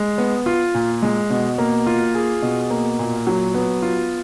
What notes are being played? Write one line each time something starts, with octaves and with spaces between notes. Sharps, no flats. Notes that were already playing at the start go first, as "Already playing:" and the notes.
Already playing: G#3
B3
F4
A#2
G#3
B2
A#3
F4
G#4
B2
A#3
A#2
F#3
B3
F4